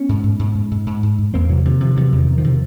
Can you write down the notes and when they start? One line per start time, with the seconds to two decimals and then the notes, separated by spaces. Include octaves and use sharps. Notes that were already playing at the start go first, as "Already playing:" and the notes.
Already playing: B3 C#4
0.09 G#2
0.24 G#2
0.39 G#2
0.55 G#2
0.71 G#2
0.86 G#2
1.03 G#2
1.18 G#2
1.34 E2 A#3 C4
1.49 C3 E3 F#3
1.65 C3 D#3 F3
1.80 C3 D#3 F3
1.96 C3 E3 F#3
2.12 E2
2.18 D#3
2.27 E2
2.38 D#3 F3
2.44 C3